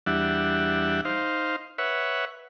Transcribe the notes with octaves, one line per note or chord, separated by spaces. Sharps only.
E2 G3 D4 E5 F#5
D#4 C5 F5
B4 C#5 E5 F#5